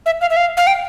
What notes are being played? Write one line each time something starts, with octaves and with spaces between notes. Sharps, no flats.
E5
F5
E5
F5
F5
G5